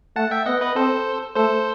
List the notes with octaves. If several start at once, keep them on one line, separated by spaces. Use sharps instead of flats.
A3 F#5 A5
E5 G5
B3 D#5 F#5
B4 D#5
C4 A4 C5
A3 A4 C5